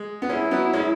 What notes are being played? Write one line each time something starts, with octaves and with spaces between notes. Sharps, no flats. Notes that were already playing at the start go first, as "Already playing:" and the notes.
Already playing: G#3
B3
G#3 C#4 E4
F#3 B3
G#3 C#4